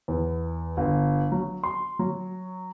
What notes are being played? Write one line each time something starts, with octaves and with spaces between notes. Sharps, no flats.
E2
G1
F#3
C6
F#3